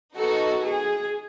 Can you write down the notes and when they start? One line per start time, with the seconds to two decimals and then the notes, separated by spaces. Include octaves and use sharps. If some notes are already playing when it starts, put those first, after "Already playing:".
0.16 B3 D#4 F#4 A4
0.63 G#4